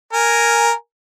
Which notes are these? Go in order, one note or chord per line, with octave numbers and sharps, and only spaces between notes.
A#4 G#5